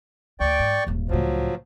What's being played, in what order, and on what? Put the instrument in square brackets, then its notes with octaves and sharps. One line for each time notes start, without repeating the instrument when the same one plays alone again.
[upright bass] D2 [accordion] D5 G5 C#6
[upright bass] G#2
D#1 G#1
[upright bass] C#2 A2 [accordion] F3 F#3